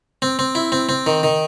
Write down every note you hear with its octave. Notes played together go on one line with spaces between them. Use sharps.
C4
C4
E4
C4
C4
D#3
D#3